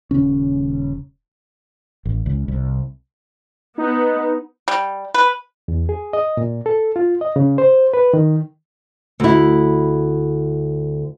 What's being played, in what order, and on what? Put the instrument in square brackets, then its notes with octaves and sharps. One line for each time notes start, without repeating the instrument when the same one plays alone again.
[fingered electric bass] D#1 C#3 C#4
[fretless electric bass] A1
C#2
C2
[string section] B3 [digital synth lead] D#4
[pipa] G3
B4
[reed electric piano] E2
G#4
D#5
A#2
A4
F4
D#5
C#3
C5
B4
D#3
[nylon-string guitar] D2 E4